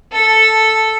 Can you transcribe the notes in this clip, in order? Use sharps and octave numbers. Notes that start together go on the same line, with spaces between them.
A4